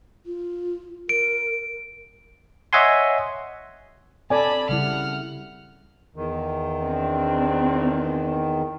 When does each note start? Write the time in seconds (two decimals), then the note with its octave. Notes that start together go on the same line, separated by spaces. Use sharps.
0.26 F4
1.09 A#4 D7
2.73 C#5 D#5 E5 F#5 G#5 C6
4.30 C4 A4 D5 G#5 A5 B5
4.69 C#3 G3 E4 F#5 F6
6.16 E2 D#3
6.83 C4 D4